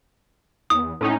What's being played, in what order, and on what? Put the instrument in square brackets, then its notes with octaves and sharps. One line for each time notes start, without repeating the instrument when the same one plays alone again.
[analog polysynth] E2 [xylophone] D#6
[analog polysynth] A2 C#4 D#4